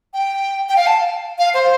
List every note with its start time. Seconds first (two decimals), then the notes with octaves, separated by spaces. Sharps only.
0.14 G5
0.69 G5
0.77 F5
0.86 A5
1.39 F5
1.54 C5